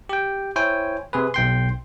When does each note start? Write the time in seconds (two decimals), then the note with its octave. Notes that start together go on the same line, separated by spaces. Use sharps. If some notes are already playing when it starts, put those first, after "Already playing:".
0.09 G4 G5
0.56 E4 C5 C#5 G5 G#5
1.13 C3 G#4 B4
1.34 B1 G5 C6